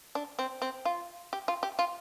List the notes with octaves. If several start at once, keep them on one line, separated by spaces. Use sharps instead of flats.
D4
C4
C4
F4
G4
F4
G4
F4